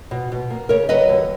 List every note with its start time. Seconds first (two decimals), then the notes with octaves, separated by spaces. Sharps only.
0.11 B2
0.32 B2
0.50 A#3
0.69 C#3 A#4 C#5
0.89 F#3 B4 D#5
1.09 D#2